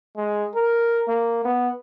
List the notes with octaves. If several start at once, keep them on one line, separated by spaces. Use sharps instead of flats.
G#3
A#4
A#3
B3